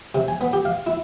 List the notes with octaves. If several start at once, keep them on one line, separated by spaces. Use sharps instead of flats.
C3
G#5
B3
G4
F5
E4